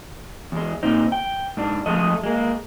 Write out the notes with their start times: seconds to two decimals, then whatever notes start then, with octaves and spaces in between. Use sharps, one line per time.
0.52 E2 G#3
0.83 A#2 C4 D#4
1.12 G5
1.57 G#2 D4
1.86 F3 G#3 A3 D#5
2.23 G#3 A#3